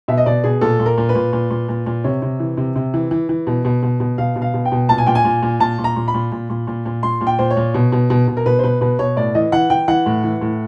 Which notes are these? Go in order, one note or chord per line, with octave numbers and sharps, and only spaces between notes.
B2 E5
D#5
B2 D5
B2 G#4
A#2 A4
A#2
A#4
A#2
B4
A#2
A#2
A#2
A#2
A#2
C3 C#5
C3
E3
C3
C3
E3
E3
E3
B2
B2
B2
B2
B2 F5
B2
F5
B2
G5
B2
A#2 A5
G#5
A#2 G5
G#5
A#2
A#2
A#2 A5
A#2
A#5
A#2
B5
A#2
A#2
A#2
A#2
A#2
A#2 C6
A#2
G5
A#2 C5
C#5
A#2
B2
B2
B2
B2
A#4
B2 B4
C5
B2 B4
B2 B4
B2 C#5
A2 D5
E3 D#5
E3 F#5
E3 G5
E3 F#5
A2
E3
A2